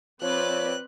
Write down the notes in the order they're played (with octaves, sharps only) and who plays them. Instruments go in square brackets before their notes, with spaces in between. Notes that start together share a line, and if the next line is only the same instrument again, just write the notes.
[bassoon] F3 [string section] C4 B4 D5 [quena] C#5 [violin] F#6